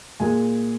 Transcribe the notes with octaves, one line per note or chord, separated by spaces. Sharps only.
A#2 G#3 G#5